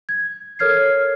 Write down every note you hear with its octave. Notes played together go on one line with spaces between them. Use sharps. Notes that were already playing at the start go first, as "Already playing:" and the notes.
G#6
A4 A#4 C#5 F6 G#6 C7